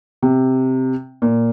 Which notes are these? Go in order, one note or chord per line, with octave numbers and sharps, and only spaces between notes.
C3
A#2